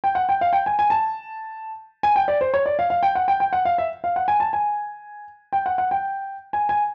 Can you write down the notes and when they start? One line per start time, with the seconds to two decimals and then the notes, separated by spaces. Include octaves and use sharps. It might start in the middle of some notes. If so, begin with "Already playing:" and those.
0.04 G5
0.15 F#5
0.29 G5
0.41 F5
0.53 G5
0.66 G#5
0.79 G#5
0.90 A5
2.03 G#5
2.16 G5
2.28 D5
2.41 C5
2.54 C#5
2.66 D5
2.79 F5
2.90 F5
3.03 G5
3.15 F#5
3.28 G5
3.40 G5
3.53 F#5
3.65 F5
3.78 E5
4.04 F5
4.16 F#5
4.28 G#5
4.40 A5
4.53 G#5
5.53 G5
5.66 F#5
5.78 F#5
5.91 G5
6.53 G#5
6.69 G#5